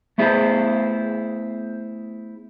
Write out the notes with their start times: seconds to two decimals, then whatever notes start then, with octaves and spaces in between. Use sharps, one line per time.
0.18 A3 B3 E4 G#4 C5